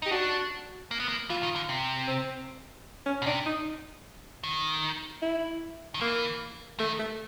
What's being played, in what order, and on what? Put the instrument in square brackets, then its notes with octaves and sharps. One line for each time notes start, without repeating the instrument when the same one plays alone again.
[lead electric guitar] D#4 [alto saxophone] G4
[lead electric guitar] D4 [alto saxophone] F#4
[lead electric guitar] A#3
B3
A#3
[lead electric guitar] E3 [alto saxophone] F4
[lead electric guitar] D#3
D3
C3
[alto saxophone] C4
C#4
[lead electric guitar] B2
[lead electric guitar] C3 [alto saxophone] D4
[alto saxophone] D#4
[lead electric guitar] D#3
[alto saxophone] E4
[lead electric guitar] D#3
[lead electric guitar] E3 [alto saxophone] A#3
[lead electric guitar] D#3 [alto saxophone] A3
[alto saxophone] A3